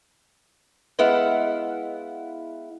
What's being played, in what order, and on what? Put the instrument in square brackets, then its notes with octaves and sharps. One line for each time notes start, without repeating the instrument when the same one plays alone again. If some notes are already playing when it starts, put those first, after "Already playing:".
[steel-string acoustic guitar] G#3 B3 E4 F5 F#5